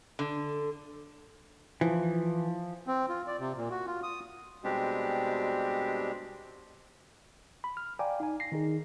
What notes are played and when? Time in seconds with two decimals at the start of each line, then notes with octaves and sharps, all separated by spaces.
0.19 D3
1.81 E3 F3
2.87 C4
3.09 F4
3.27 D5
3.39 C3
3.57 A#2
3.70 F#4
3.87 F4
4.03 D#6
4.64 B2 G3 G#3 C4 D4 G4
7.64 B5
7.77 F6
7.99 D5 F5 G5 G#5 A#5 D6
8.20 D#4 G#5
8.40 G#5 A#6 C7
8.52 D#3 D#4 G#4